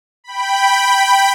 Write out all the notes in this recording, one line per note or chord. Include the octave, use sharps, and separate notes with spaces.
G5 B5